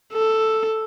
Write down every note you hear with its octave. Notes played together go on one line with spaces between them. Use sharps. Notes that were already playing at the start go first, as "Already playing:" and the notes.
A4